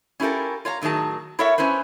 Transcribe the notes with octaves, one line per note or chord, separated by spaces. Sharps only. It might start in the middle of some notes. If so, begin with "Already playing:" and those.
C#4 E4 F4 G4 A4 A#4
F4 C#5 F5 A#5
A2 D#3 F#3 G#4 A5
E4 A4 A#4 C#5 E5 F#5
B3 C#4 E4 B4 C5